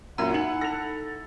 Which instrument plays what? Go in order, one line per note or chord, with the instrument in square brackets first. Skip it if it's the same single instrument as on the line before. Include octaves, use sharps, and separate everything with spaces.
[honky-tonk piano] F#2 A#2 F#3 [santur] E4 [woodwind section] F#5 [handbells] A#5
[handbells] D#4 [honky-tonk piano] C#7 F#7
[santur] A4 [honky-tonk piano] A#6 F7